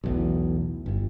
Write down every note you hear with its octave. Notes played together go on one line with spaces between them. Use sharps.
B1 E2 A2
G1 G2